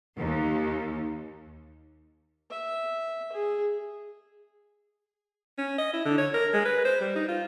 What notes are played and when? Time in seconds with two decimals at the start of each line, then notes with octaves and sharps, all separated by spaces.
0.17 D#2
2.50 E5
3.32 G#4
5.58 C#4
5.78 D#5
5.93 E4
6.05 D3
6.18 C#5
6.34 A#4
6.53 G#3
6.65 B4
6.85 C5
7.01 G3
7.15 D#4
7.28 F4